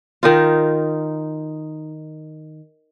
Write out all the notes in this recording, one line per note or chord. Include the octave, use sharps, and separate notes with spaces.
D#3 D#4 F4